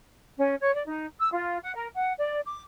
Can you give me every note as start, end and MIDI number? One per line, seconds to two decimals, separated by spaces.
0.38 0.54 61
0.60 0.72 73
0.74 0.82 74
0.87 1.07 63
1.19 1.29 88
1.32 1.56 65
1.62 1.75 78
1.76 1.88 70
1.94 2.12 78
2.17 2.39 74
2.46 2.62 86